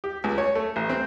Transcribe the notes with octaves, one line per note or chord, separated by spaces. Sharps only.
G4
C#2
C#5
A3
A1
C4